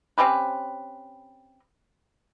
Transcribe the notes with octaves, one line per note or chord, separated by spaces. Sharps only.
C4 C#4 G4 B4